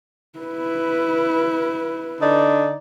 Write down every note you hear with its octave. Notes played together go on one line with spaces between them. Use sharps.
E4 B4
D3 D#4 D5